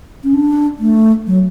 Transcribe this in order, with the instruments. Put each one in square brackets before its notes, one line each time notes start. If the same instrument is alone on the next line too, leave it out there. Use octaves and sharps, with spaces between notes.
[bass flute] C#4
D4
A3
F#3